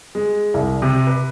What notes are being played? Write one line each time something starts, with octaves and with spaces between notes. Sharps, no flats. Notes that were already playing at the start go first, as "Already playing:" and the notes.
G#3
C2
C3
B4